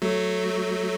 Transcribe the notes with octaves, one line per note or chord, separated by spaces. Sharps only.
F#3 A3